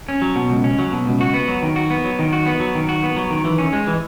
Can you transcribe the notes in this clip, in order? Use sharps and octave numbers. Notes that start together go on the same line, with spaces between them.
C#4
F#3
B2
C#2
C#4
F#3
B2
C#2
F#4
B3
F#3
D#3
F#4
B3
F#3
D#3
F#4
B3
F#3
D#3
F#4
B3
F#3
D#3
E3
C#4
G#3
E3